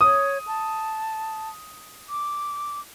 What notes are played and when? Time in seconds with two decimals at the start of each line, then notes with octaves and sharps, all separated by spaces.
0.01 C#5 D#6
0.47 A5
2.09 D6